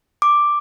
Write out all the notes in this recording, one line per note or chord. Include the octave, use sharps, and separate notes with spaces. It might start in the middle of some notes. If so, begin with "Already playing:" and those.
D6